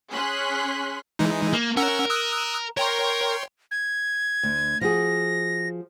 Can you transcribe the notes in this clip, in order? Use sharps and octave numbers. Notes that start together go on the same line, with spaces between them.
C#4 G#4 C6 F#6 B6
E3 G#3 D#4
A#3
C#4 A#4 F#5 E6
D#6 E6 F#6
A#4 C#5 G5 C6
G#6
D2
F3 F#4 G#4 A#6